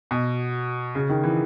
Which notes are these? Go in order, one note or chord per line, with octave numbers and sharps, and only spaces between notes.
B2
C#3
D#3
E3